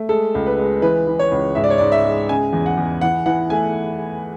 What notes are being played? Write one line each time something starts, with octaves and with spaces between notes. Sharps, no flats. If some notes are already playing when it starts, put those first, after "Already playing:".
Already playing: A3
G#3 A4
C#2
B4
G#3
E3 B4
E3
C#5
C#2
G#2 E5
D5
C#5
G#2 D5
E5
G#3
C#3 G#5
E2
F#5
E2
E3 F#5
E3 F#5
A3 G#5